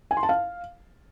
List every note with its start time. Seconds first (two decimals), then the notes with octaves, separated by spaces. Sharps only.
0.11 G#5
0.17 C6
0.23 A5
0.29 F5